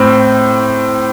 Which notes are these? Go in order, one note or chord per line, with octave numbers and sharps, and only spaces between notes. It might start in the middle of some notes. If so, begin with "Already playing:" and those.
Already playing: A2 C4